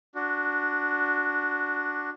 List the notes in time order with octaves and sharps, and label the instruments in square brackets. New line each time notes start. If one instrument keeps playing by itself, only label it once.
[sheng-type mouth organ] D4 F#4